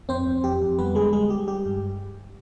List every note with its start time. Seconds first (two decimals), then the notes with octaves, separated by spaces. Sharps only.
0.09 F2 C4 C5
0.27 F2
0.44 F2 G4
0.61 F2
0.79 G3 B3 B4
0.95 D3 G#3 G#4
1.13 G3 G#3 G#4
1.30 G3 G4
1.48 G3 G4
1.65 G2